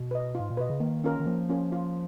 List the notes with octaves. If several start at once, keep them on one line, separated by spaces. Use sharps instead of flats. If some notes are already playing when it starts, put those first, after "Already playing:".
Already playing: B2
B4 D#5
G#2 F4
A#2
B2 B4 D#5
C#3
D#3 A#3
C#4 F4 A#4
D#3
F3 A#3
C#4 F4 A#4
F4